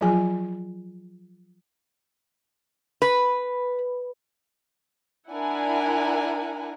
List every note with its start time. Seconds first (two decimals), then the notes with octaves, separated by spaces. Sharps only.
0.01 F3 F#3 F4 G#4 G#5
3.02 B4
5.31 D4 E4 A#4 F#5 G#5